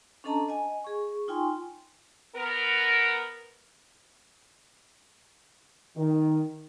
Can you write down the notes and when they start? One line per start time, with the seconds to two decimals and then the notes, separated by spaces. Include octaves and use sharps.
0.24 C#4 D4 A4 D#5 A5 A#5
0.49 D#5 G#5
0.84 G#4 C#6
1.28 D#4 F4 G5 G#5 C6 C#6
2.36 B3 A#4
5.96 D#3